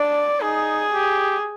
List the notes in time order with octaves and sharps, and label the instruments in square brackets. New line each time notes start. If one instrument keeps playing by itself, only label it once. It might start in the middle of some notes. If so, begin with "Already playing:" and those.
Already playing: [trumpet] D4 [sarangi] D5
[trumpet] D#4 [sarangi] G#4
[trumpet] G4